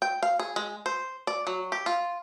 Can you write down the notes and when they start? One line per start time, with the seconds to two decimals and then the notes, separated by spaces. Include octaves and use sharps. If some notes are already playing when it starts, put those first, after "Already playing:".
0.02 G5
0.23 F5
0.39 G#4
0.56 G#3
0.86 C5
1.27 D5
1.47 F#3
1.72 G4
1.86 F4